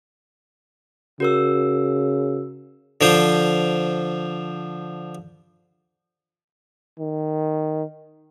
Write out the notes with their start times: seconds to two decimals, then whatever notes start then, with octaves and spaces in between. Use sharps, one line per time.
1.20 C#3 F#4 A#4 E6
3.01 D3 F3 C5
6.99 D#3